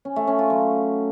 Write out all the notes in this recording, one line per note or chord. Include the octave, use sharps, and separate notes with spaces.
C#4
A3
C#4
F4
F#3